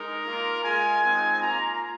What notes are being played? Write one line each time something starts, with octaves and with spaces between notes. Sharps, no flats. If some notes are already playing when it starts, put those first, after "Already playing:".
Already playing: G#3 D#4 A#4
A#3 F4
G#3 F4 G#5
G#3 C4 D#4
A#3 F4 A#5